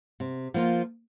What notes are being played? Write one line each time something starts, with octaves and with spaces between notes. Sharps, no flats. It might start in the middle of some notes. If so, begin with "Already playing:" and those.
C3
F3 A#3 F4